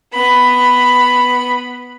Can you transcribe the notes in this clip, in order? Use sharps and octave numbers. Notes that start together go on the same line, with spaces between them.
B3 B5